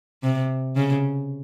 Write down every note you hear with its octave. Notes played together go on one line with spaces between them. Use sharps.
C3
C#3